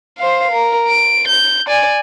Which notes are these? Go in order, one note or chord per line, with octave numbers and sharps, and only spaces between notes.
C5 F5
A#4
D7
G6
D5 G#5